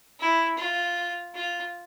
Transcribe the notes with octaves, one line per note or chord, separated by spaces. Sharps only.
E4
F4
F4